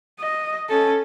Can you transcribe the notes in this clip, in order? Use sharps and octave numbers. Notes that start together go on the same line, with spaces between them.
D#5
C#4 A4